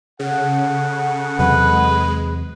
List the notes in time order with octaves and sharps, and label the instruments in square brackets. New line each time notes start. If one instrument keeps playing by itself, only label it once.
[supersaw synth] C#3 [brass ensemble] A4 F#5
[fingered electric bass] E2 C3 F#3 [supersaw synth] G#3 [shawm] B4